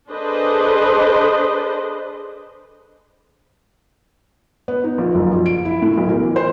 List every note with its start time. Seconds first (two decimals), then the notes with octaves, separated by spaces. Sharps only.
0.10 D4 G#4 A4 B4 C5 D#5
4.68 B3
4.84 D#4
4.98 A#1
5.15 F#1
5.32 A#1
5.46 D7
5.65 E4
5.82 A2
5.97 B1
6.09 A#4
6.23 E3
6.36 C5